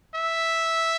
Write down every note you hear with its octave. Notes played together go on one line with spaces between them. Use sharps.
E5